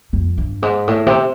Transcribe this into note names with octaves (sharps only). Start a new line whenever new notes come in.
F2
G2
G#2
A2
C3